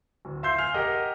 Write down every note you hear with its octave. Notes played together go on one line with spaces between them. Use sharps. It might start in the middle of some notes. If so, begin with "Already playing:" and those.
D1
E5 F5 C6 E6 G6 C7
G#5 F6 C7 F7
G4 A#4 D#5 F#5